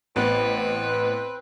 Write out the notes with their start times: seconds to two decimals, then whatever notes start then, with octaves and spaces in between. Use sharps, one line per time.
0.16 A1 B3 C4 B4